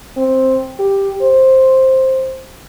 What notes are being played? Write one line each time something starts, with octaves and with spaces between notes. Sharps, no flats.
C4
G4
C5